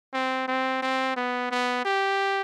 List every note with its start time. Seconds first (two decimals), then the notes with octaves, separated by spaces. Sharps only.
0.13 C4
0.48 C4
0.82 C4
1.17 B3
1.51 B3
1.85 G4